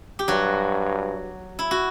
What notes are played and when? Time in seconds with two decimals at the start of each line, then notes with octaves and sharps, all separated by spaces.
0.19 G4
0.28 G2 F#3 F#4
1.59 E4
1.71 F#4